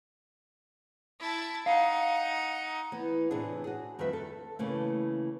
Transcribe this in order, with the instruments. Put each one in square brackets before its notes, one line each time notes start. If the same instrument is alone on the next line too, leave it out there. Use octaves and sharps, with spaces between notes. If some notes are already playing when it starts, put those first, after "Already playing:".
[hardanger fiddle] E4 A5
[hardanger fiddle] D#4 F#5 [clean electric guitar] F5
[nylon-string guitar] E3 B3
A2 C3 E3 C4 D4 G#4
F#4 G#4
F2 D#3 G3 F4 B4 E5
A4
C#3 E3 A3 A#3